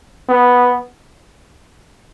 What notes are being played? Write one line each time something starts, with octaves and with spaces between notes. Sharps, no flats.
B3